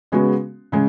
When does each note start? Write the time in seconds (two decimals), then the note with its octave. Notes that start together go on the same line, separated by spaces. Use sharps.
0.12 C#3 G#3 B3 F#4
0.72 C#3 G#3